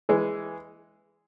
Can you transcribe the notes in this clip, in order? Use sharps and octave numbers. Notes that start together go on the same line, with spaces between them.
E3 G#3